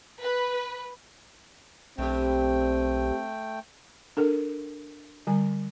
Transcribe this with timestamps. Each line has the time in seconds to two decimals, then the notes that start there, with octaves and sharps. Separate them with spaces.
0.23 B4
1.98 B1 G2 A3 C4 G4 G5
4.17 D4 A4 A#4
5.27 D3 G3 G#5